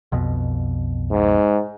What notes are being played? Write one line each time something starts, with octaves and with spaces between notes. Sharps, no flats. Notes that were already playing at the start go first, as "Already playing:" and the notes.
B1 F2 B2
G#2